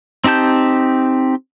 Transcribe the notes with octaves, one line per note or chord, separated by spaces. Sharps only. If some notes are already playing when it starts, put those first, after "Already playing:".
C4 D#4 G4 A5 G6